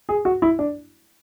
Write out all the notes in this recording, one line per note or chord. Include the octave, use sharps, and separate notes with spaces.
G#4
F#4
E4
D4